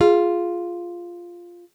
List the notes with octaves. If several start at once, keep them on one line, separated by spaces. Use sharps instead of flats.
F4 G#4